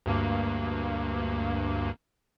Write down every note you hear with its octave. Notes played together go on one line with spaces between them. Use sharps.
D2 G2 A#3